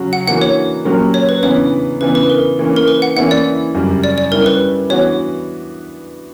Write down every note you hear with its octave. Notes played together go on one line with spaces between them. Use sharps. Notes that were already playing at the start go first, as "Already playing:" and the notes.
Already playing: C#3 F#3 C#4 F#4
F#5
E3 A#3 D4 F#4 F#5
C#5
A#2 F#3 C#4 G4 A#4
C#5
B4
C#3 E3 B3 D4 C#5
C#3 E3 B3 D4 B4
B4
A#4
E3 A#3 C#4
A#4
B4
F#5
E3 A#3 C#4 E4 F#5
D5
F#2 C#3 G3
D5
D5
G3 C#4 E4 G4 A#4
B4
E3 B3 D4 F#4 C#5